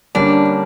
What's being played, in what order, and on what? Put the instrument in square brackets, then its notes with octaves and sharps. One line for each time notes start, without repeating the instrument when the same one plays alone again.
[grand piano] D3 G3 A#3 C#4 [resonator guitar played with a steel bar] D4